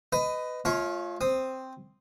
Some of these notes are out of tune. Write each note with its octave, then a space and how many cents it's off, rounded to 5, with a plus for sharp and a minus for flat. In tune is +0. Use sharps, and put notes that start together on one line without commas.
B4 +20 D#5 +0
A3 -40 F4 +0 C#5 +0
C4 +0 D#6 -5